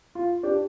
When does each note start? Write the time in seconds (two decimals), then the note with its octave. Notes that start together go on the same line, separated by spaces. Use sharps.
0.15 F4
0.43 D4 G4